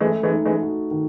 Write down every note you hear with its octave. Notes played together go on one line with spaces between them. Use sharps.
E3 G#3 A3
E3 G#3
D#4
E3 G#3
F#4
D#3